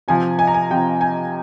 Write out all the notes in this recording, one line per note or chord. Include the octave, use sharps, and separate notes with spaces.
C3 F3 G#5
G#5
A#5
G#5
C3 F3 G5
G#5